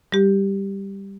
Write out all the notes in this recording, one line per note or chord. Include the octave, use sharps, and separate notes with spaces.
G3 G4